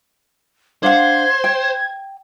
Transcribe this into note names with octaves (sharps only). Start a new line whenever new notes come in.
D4 C5 F5 F#5 G#6
G5